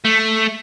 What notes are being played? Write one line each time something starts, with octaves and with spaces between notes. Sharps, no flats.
A3